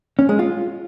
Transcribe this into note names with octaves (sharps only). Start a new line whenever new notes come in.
C#4
G#3
F4